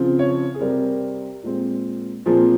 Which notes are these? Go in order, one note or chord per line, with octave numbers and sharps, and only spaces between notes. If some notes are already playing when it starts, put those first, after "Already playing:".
Already playing: C#3 F3 C4
C#5
G#4
C3 G3 C4 A#4
A#2 G#3 C4
A#2 F3 C4 G#4